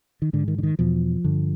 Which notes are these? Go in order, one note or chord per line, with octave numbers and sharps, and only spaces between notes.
D#3
G#2 D3
D#3
D3
D#3
E2 B2 F3
G2 D3